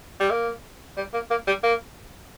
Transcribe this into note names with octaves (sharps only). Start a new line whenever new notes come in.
G3
A#3
G3
A#3
A#3
G3
A#3